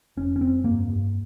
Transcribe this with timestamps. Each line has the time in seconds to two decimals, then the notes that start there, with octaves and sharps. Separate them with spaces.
0.17 F1 C#4
0.36 C#4
0.41 F1 C4
0.64 G2 A#3
0.88 G2